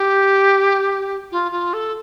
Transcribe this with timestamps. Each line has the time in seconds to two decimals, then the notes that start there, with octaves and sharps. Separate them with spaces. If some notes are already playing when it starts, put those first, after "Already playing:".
Already playing: G4
1.32 F4
1.52 F4
1.74 A4